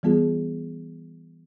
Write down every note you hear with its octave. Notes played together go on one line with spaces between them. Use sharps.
E3 G3 B3 F4 G#4